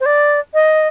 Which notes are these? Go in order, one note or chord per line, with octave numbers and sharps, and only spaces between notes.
C5
D5
D#5